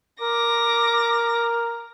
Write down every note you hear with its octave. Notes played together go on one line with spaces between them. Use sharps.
A#4 D6 A#6